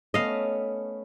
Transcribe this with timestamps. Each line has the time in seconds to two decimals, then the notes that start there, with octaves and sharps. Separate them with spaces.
0.14 A3 B3 C#4 D#5 F5